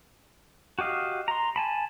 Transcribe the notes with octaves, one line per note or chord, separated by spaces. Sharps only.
F#4 G4 D#5 F5
A#5 C6
G#5 A5 B5